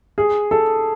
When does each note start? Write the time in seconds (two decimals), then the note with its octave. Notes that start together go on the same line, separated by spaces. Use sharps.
0.18 G#4
0.51 A4